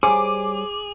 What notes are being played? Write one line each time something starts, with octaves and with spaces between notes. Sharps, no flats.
G3 G#4 C5 C#5 G#5 D6